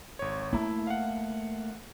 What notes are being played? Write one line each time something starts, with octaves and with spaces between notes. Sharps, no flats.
G#1 C#5
A3 A#3 E4
F5 F#5